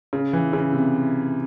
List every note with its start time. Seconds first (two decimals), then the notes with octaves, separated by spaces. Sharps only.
0.13 C#3
0.33 E3
0.53 C#3
0.73 C3